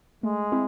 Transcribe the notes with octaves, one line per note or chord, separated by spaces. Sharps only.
G#3 A3
C4 E4